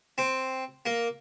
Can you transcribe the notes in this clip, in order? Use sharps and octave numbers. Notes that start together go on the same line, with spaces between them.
C4
A#3